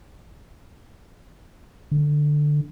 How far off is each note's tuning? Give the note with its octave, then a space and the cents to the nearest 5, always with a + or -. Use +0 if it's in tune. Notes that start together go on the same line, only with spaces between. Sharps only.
D3 +10